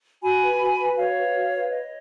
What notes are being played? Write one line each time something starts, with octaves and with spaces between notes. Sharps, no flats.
F#4 G#5 B5
B4
F#4
B4
F#4 C#5 F5
B4
F#4
B4
C#5 D#5